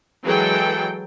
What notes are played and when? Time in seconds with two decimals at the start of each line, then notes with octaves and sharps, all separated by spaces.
0.23 E3 F#3 G#3 G#4 A4 G5